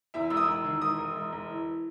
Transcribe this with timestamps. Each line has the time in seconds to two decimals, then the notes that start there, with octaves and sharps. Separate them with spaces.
0.14 E2 E5
0.30 E1 E6
0.37 D#6
0.48 E1
0.64 D#3
0.81 E1 D#6
0.98 E1
1.16 E1
1.32 E1
1.50 E3